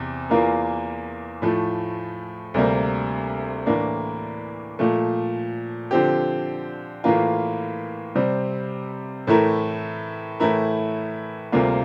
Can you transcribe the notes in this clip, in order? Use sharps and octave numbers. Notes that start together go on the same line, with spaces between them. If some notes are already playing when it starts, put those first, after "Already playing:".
Already playing: E2 C3
E2 E3 A#3 F4 A#4
A2 F3 A3
D2 C3 G3 A#3
A2 E3 A#3 D4
A#2 F3 A3
D3 F3 C4 G4
A2 E3 A#3 F4 A#4
C3 G3 C4
A2 E3 A3 E4 A#4
A2 E3 A3 E4 A#4
D2 C3 G3 A#3 F4